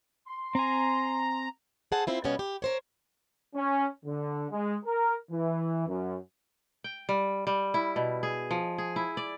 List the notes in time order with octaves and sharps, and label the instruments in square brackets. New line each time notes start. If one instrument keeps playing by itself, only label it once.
[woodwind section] C6
[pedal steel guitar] C4 G#5 [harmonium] A#5
[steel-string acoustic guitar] G#4 A4 C5 F#5 A5
C4 E4 F4
B2 G3 A#3 B3 C#4
G4
A#4 C5 C#5
[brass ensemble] C#4
D3
G#3
A#4
E3
F#2
[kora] G5
G3
G3
E4
B2
G#4
F3
G#4
E4
D5